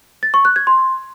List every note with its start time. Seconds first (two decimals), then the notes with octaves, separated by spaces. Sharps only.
0.23 A6
0.34 C#6
0.45 F#6
0.56 G#6
0.67 C6